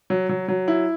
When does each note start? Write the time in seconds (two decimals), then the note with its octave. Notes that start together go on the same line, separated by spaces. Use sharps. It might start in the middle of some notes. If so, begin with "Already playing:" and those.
0.10 F#3
0.29 F#3
0.48 F#3
0.68 E4